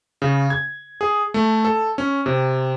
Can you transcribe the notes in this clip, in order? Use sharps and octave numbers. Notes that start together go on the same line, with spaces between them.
C#3
G#6
G#4
A3
A4
C#4
C3